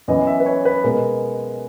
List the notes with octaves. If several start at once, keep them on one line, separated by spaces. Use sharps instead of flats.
F#2 E3 B3 D#5
E5
B4
C#5
B4
B2 G#3 B3 A#4